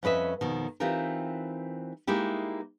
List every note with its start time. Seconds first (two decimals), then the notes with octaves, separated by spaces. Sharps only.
0.03 F2 C#4 B4 D#5 E5
0.41 F2 B2 D#3
0.80 E3 C4 D#4 F4 G4 A#4
2.07 G#3 A#3 D#4 E4 G4